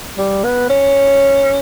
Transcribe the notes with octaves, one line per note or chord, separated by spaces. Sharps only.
G3
B3
C#4